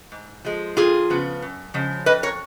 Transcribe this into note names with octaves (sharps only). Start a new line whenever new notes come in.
G#2
F3 G#3
F2 F4 G#4
C#3 F3 B3
F#2
C#3 F3 G#3
F2 B4 D#5
A#4 C#5